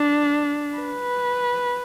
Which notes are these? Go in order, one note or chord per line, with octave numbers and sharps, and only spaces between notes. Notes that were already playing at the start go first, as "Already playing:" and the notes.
Already playing: D4
B4